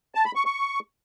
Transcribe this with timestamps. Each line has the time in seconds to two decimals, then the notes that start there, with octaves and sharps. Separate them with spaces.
0.15 A5
0.25 B5
0.35 C#6
0.46 C#6